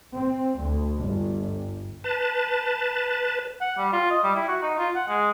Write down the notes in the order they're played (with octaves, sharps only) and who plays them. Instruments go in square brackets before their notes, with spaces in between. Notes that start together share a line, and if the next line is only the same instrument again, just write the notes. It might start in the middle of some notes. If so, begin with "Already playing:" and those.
[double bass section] C4
D2
G1
[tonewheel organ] B4 A5
[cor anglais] F#5
G3
F4
D#5
G3
E4
F#4
D#4
F4
F#5
G#3